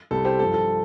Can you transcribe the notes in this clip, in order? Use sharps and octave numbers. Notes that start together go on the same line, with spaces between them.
C2 C3 G3 A4
G4 C5
G2 F3 A4
A4